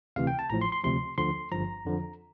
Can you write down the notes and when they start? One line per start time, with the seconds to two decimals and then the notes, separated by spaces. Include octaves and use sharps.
0.16 D2 C3 E3 F5
0.27 G5
0.39 A5
0.50 A1 A2 F3 A#5
0.61 C6
0.72 C6
0.84 D2 C3 F3 C6
1.18 D2 D3 F3 C6
1.51 G1 G2 F3 A#5
1.85 F2 D3 F3